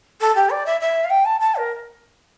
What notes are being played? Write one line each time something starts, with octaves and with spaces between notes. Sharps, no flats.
A4
G4
D5
E5
E5
F5
G5
A5
A5
A#4